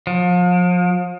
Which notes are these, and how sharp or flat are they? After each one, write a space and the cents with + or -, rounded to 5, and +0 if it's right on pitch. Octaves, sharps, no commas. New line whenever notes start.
F3 +35